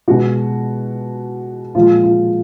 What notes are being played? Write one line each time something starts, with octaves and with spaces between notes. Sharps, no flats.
B2 G#3 F#4
A#2 F3 G#3 F4
F4